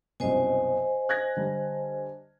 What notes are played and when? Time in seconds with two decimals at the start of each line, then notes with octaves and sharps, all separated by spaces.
0.20 C2 F#2 B2 C5 D#5 G#5
1.09 F#6 G#6 A#6
1.37 D3 G3